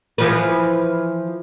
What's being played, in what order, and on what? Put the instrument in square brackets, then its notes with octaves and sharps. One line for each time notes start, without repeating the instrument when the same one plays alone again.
[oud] E3 F3 B4